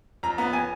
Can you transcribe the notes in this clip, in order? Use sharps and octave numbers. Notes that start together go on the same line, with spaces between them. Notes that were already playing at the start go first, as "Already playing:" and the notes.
F2 A#5
B3 A#5
G#5